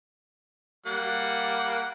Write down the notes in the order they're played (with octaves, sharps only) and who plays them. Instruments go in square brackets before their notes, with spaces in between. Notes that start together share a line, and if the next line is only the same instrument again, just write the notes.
[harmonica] G3 A#3 F#5